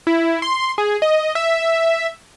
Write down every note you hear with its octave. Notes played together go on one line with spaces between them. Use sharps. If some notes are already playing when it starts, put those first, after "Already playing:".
E4
C6
G#4
D#5
E5